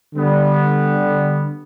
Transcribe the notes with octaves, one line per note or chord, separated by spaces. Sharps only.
D3 G3 B3